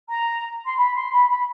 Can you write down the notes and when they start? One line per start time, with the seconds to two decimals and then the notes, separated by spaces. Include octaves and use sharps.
0.08 A#5
0.65 C6
0.77 B5
0.94 C6
1.12 B5
1.29 B5